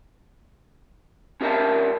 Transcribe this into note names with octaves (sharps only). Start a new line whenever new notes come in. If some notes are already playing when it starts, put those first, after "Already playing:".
C#4 G4 A#4 E5 A5